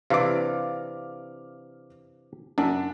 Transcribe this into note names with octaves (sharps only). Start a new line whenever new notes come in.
C3 E3 D4 F5 D6
F#2 D4